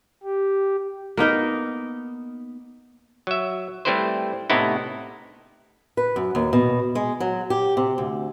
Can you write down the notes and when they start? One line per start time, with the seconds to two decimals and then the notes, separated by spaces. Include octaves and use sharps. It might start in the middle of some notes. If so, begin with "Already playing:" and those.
0.23 G4
1.17 A#3 B3 D#4 A#4
3.27 F#3 E5
3.85 G3 A3 C4 E4 B4 C5
4.50 A2 C3 B3 D#4 E4
5.97 B4
6.16 F#2
6.35 D#2
6.53 B2
6.95 G#3
7.20 F#3
7.50 G4
7.77 C3
7.98 D2